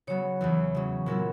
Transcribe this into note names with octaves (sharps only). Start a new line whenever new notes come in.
C#3 F#3 B3 C#5
E2 C#3 E3
C#3 F#3 C#4
A#2 F#3 B3 E4 A#4